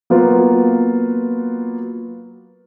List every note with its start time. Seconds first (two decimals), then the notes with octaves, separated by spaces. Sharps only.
0.10 F#3 A#3 B3 F4 B4